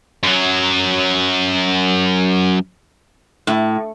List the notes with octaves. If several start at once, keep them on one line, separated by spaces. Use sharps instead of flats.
F#2 F#3
A2